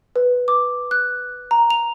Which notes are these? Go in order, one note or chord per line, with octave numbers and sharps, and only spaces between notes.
B4
D6
F#6
A#5
F7